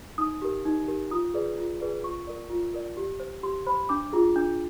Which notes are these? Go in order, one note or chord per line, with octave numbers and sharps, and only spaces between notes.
D#4 D#6
G4 A#4
D#4
G4 A#4
F4 D#6
G#4 B4 D5
F4
G#4 B4 D5
F4 C#6
A#4 D5
F4
A#4 D5
G4
C5
G4 C6
C5 B5
D4 D6
F4 G#4
D4